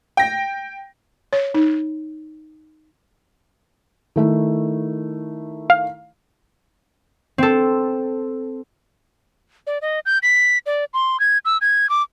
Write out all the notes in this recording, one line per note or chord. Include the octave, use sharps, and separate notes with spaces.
G5 A#6
C#5
D#4
D#3 A3 E4
F5
C4 A4
D5
D#5
G6
B6
D5
C6
G#6
E6
G#6
D6